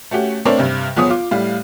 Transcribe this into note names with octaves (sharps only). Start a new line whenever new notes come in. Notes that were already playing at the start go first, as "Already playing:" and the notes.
A3 C#4 F#4 G4
A3 C4 D4 A#4 C#5 D5
G2 C3
G1 F3 B3 G#4 C#5 D#6
F4 D6
A2 G3 F5